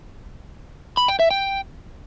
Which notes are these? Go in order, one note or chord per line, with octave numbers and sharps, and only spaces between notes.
B5
G5
E5
G5